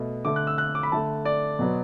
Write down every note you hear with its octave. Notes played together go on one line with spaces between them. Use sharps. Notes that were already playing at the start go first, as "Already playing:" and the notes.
Already playing: B2 A3
D3 A3 D6
F#6
E6
F#6
D6
B5
D3 A3 A5
D5
B2 F#3 B3